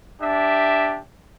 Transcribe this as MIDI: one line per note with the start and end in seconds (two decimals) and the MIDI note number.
0.22 0.99 62
0.22 0.99 67
0.22 0.99 76